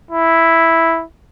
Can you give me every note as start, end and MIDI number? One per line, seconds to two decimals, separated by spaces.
0.11 1.03 64